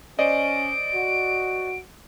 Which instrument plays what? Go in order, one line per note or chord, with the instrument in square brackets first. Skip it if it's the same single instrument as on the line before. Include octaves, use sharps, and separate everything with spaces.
[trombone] C#4 [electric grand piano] C5 D5 D#5 [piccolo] D7
[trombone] F#4